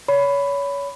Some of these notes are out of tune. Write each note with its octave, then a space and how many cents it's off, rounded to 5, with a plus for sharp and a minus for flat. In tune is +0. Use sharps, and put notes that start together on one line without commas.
C#5 +30 B5 +10